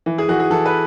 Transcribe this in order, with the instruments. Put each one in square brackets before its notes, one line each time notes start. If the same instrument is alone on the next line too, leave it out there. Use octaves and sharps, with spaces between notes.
[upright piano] E3
G#4
E3 F#4
G#4
E3 A4
B4